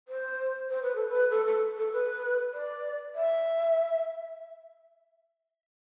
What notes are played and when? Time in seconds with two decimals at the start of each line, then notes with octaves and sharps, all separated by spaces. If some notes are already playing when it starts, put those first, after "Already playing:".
0.08 C5
0.70 C5
0.83 B4
0.95 A4
1.09 B4
1.31 A4
1.46 A4
1.77 A4
1.93 B4
2.53 D5
3.15 E5